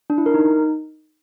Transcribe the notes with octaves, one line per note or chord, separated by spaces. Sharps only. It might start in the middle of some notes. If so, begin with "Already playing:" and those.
D4
E4
A#4
D#4